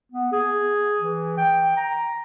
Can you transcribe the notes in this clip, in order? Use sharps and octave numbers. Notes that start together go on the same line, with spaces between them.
B3
G#4
E3
G5
A#5